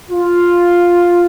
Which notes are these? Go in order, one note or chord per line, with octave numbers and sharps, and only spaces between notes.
F4